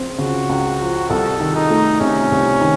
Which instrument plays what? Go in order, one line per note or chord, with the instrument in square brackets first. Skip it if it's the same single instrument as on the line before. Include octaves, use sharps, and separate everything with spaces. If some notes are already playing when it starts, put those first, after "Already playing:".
Already playing: [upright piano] C#2 F3 C4
[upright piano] C#3 [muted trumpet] F#4
[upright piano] C#2
F3
[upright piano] C2 [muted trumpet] A4
[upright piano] D#3
[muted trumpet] D#4
[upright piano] A3
[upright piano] C3 [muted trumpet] C#4
[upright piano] C2
D#3